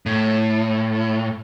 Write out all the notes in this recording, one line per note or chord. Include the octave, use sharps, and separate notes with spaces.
A2